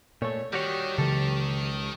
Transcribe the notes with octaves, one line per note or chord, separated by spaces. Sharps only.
A#2 A3 C#5
D#3 G3 F#4 G4 C#5
C#2 C#3 E3 F#3 A4